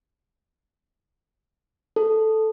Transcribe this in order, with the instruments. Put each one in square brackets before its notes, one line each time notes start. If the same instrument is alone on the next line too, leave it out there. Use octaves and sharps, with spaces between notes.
[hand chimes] A4